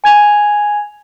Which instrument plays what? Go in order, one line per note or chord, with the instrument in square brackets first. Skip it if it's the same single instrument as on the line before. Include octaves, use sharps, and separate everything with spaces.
[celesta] G#5 G#6 F7